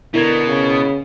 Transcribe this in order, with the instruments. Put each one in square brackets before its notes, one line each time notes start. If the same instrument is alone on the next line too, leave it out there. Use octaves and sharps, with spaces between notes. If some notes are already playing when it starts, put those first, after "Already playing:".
[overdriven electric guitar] B2 [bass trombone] D3 [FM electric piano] E4 A#4 G#6
[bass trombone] C#3